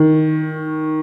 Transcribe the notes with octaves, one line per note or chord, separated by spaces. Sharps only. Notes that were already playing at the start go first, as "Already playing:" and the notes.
Already playing: D#3